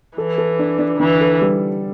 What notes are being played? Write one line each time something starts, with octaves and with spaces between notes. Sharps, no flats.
E3 A4
A4
D4
D4
D3 E3
A4
G3